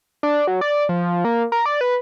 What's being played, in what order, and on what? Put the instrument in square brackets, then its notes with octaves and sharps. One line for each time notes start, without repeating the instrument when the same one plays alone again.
[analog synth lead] D4
F#3
D5
F3
A#3
A#4
D5
B4